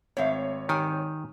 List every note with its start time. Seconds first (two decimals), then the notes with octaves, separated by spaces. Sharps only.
0.17 G#1 A3 C4 C#5 E5 F5
0.69 D#3 G4 G#5